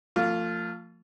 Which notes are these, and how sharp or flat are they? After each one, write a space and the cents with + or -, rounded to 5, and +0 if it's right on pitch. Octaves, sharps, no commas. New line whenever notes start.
F3 +0 A3 +45 F4 +0